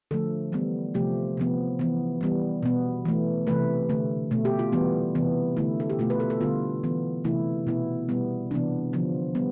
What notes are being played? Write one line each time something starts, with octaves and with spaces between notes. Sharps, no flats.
D3 F3 A3 A4
E3 G3 B3
C3 F3 A3 G4
C3 F3 B3
E3 B3
E3 G3 B3
B2 B3
E3 A3
C3 E3 A3 B4
D3 A3
B2 A3
G4
F4
E3 G3 B3
C3 E3 B3
D3 A3 E4
A4
G4
B2 A3 F4
B4
A4
A4
D3 G3 B3 F4
E3 B3
C3 E3 A3 E4
B2 B3 E4
B2 G3 B3
C3 E3 B3 D4
D3 F3 B3
G3 B3